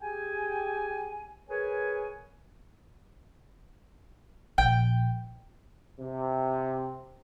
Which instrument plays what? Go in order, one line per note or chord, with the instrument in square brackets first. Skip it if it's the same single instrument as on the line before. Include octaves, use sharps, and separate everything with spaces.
[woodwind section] G4 G#4 G5 G#5
G#4 A#4 B4 C#5 G#5
[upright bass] A#1 [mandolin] G5
[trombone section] C3